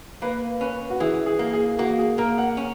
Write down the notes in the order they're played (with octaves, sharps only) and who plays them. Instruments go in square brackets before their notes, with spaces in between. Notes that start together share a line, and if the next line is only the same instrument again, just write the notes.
[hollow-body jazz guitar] A#3 [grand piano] B4
[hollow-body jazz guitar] C#4 [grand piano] B4
[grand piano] F#4
[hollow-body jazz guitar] E3 [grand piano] G#4
[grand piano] G#4
[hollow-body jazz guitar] A#3
[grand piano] G#4
[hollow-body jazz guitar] A#3 [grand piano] F#4
[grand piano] G#4
[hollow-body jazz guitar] A#3 [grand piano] A#4
[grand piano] F#5
[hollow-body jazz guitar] C#4